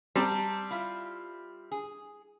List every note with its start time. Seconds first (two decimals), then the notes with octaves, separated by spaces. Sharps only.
0.16 G3 C4 A5 A#5
0.71 E4 F4
1.72 G#4